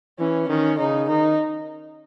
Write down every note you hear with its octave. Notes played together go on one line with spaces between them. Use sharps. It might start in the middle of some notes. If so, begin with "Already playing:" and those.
E3 C#4
D#3 C#4
C#3 D#4
D#3 D#4